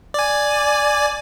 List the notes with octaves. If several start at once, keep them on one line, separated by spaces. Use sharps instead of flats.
D5 G#5